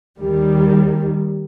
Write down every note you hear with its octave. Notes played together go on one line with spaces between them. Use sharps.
D#2 D#3 G3